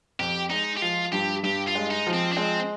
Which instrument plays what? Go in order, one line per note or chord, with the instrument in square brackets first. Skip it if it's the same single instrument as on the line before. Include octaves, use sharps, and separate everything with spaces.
[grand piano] F2 [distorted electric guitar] G4
[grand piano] G#3 [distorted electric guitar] D#4
[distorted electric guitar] G4
[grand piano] F3 [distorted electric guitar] F4
[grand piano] G2 [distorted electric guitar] G4
[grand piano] G2 [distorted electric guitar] G4
[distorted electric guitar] F4
[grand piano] G#3
[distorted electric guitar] D#4
[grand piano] F3
[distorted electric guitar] C4
D4
[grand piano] G#3 [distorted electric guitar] C4